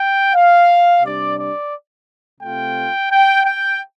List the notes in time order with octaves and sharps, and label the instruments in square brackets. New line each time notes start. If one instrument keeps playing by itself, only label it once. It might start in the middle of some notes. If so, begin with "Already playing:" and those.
Already playing: [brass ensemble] G5
F5
C3 G3 D4 D5
D5
C3 A3 C4 F4 G5
G5
G5